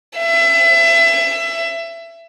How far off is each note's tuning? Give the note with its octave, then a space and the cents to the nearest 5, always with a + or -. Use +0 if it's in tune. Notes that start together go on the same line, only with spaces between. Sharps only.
E5 +25